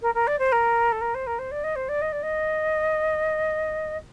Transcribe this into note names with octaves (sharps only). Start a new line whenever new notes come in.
A#4
A#4
D5
C5
A#4
A4
A#4
C5
A#4
C5
D5
D#5
C5
D5
D#5
D5
D#5